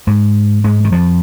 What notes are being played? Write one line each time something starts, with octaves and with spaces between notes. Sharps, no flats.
G#2 G#3
G#2 G#3
D#3
F2 F3